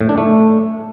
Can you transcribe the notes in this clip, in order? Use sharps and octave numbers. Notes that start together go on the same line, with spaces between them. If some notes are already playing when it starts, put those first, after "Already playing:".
A2
D4
A3